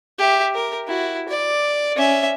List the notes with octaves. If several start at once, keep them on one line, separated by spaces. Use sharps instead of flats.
G4 E5
A#4
E4 F#4
D5
C#4 E5